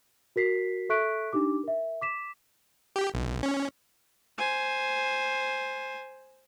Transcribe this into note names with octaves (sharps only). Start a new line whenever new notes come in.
F#4 A#4 B6 C7
A4 E5 C#6 F#6 B6 D7
D4 D#4 G4 D6
A#4 E5
D6 B6 E7
G4
B1
C#4
C5 G#5